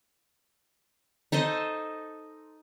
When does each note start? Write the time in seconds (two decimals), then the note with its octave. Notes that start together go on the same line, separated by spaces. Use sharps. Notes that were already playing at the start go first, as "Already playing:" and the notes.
1.32 D#4 A4 C5 D#5